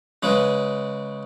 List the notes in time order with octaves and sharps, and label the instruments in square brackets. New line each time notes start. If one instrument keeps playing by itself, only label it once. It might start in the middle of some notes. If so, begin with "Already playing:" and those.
[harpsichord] C#3 G#3 G#4 B4